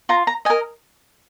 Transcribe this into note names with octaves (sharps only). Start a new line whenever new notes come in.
F4 A#5
A#5
A#4 D#5 G#5